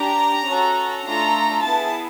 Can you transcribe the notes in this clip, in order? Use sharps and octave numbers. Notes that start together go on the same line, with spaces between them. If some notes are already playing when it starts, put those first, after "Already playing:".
Already playing: D4 G4 A#5
C#4 F#4 A4
A3 D4 F4 A4 A#5
B3 E4 G#4 A5